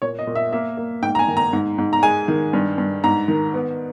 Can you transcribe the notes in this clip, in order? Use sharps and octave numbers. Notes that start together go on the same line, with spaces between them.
A#2 C#5
D#5
A#2
E5
A#3 E5
A#3
G#2 G5
A#5
G#5
D#3
A#5
G#2
G#2
A#5
G#3 G#5
D#3
G2
G2
G#2 A#5
D#3
B3